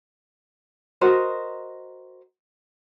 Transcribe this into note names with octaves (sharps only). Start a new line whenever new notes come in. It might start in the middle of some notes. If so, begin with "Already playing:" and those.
F#4 A#4 C5 D#5